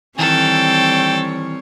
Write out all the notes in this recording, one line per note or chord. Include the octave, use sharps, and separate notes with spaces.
D#3 E3 G3 C4 A4 C#5 G5